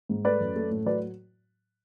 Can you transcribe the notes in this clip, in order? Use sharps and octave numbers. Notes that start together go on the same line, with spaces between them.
G#2
A3 B4 D5
F#2
A3
A2
F#3 B4 D5